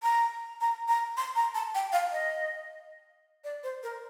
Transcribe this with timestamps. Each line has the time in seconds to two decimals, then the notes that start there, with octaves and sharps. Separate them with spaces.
0.03 A#5
0.61 A#5
0.88 A#5
1.17 C6
1.36 A#5
1.55 A5
1.75 G5
1.92 F5
2.12 D#5
3.44 D5
3.64 C5
3.83 A#4